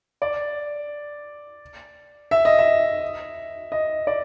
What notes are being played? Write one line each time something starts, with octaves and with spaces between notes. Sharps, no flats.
D5
E5
D#5
E5
D#5
D5